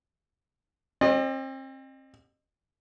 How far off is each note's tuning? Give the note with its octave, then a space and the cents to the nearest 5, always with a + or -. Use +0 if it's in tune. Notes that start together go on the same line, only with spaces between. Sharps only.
C4 +35 D#5 -35